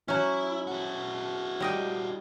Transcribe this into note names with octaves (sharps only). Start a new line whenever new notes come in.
F#3 C#4 E4
E4 F#4
G3 D#5 G5